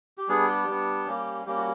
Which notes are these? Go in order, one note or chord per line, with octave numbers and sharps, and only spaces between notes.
G4
G3 B3 D4 G#4
G4
G3 B3 D4
G3 A#3 C#4
G3 A#3 C#4 G4
F#4